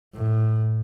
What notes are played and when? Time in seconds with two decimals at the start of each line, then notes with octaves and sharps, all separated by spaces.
0.14 A2